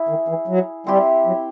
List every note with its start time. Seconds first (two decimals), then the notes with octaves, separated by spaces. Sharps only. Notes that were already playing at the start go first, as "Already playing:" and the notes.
Already playing: E4 G#4 E5
0.09 D#3
0.28 E3
0.48 F#3
0.87 G3 C4 E4 G4
1.26 F#3